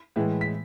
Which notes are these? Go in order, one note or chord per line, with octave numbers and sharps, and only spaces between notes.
A2 E3 G#3
B6